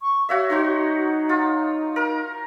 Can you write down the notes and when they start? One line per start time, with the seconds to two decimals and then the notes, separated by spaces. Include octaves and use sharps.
0.02 C#6
0.29 F#4 C#5 E5 F5
0.50 D#4 F#4 C5 C#5
1.29 F4
1.96 A#4